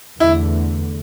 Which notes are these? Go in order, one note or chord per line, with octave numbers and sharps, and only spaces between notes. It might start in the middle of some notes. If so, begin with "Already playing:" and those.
E2 D3 A3 E4